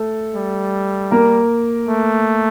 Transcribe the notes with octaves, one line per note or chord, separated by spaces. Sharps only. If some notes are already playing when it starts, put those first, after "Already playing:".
Already playing: A3 A4
G3
A#3 A#4
A3